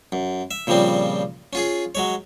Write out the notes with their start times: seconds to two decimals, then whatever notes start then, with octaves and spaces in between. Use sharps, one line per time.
0.12 F#2
0.51 E5
0.67 A#2 C#3 F3 G3 C4
1.53 C#4 F4 G#4
1.95 F#3 G#3 C#5